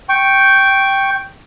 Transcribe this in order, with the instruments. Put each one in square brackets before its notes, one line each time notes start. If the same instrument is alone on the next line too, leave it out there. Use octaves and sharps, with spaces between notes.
[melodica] G5 C#6